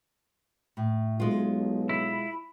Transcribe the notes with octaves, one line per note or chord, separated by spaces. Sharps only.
A2
B1 G#3 F4
E4 B5